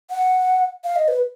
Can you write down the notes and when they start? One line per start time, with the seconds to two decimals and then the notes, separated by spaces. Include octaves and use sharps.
0.10 F#5
0.84 F5
0.96 D#5
1.08 B4